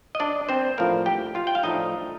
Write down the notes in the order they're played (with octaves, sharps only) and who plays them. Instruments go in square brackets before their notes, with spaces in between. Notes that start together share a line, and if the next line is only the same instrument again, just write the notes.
[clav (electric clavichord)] D#5
D4 D5
C4 C5
A2 F3 A3 A#3 D4 A#4
G4 G5
F4 F5
G5
F5
A2 F3 A3 D4 D#4 D#5